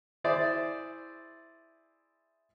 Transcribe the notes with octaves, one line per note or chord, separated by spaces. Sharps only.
E4 G#4 C5 D5 E5